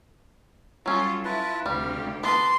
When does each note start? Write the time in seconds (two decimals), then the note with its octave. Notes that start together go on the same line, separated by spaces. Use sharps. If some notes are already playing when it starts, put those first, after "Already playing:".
0.86 F#3 G3 C#4 F4 A4
1.25 E4 F4 B4 A5
1.66 D2 C3 G3 G4 F5
2.24 B3 B4 A5 C6 D6